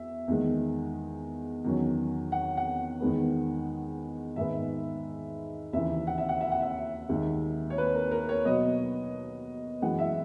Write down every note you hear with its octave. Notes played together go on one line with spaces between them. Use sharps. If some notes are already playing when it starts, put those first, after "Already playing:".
Already playing: E2 E5
E2 D#3 G#3
E2 D#3 F#3 C#4
F#5
F#5
E2 D#3 G#3 B3
G#2 D#3 G#3 B3 E5
D#2 C#3 E3 E5
F#5
E5
F#5
E5
F#5
E5
D#2 D#3 G#3
C#5
B4
A#4
A#4
C#5
B2 F#3 B3 D#5
F#2 E3 G#3 F#5
E5